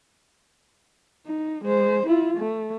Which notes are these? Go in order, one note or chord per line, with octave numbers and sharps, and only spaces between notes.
D#4
G#3 C5
E4 F4
A3